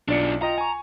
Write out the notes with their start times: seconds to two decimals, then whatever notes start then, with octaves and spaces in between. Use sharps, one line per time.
0.08 B1 D4 F4 D5 C#7
0.42 F4 D#5 G5 A#5
0.58 G#5 C#6